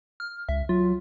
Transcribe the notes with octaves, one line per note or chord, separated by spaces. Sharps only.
F6
C#2 E5
F#3 F4